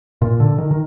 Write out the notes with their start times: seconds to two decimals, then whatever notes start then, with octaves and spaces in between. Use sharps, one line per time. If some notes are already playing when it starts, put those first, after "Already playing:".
0.22 A#2
0.40 D3
0.58 D#3
0.71 D#3